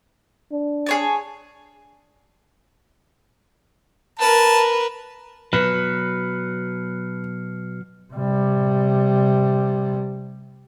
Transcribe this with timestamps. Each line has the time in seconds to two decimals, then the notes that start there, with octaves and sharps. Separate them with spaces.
0.52 D4
0.86 G#4 C#5 A5
4.19 A#4 B4 A5
5.53 B2 F#3 B4 F6 C7 C#7
8.13 C3 G3